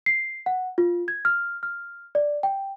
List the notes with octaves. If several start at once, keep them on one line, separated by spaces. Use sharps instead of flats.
C7
F#5
F4
G#6
F6
F6
D5
G5